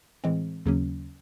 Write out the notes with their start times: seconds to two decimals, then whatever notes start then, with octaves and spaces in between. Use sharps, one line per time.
0.24 A2 E3 G#3 C4
0.66 D#2 C#3 F#3 A#3 C#4